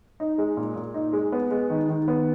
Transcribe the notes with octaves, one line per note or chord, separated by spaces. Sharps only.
D#4
G#3
A#2
A#2
D#4
G#3
B3
G#3
D#3
D#3
B3